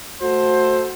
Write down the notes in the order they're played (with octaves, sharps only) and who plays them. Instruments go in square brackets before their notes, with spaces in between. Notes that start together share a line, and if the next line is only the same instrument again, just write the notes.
[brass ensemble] A3 F#4 A4 C5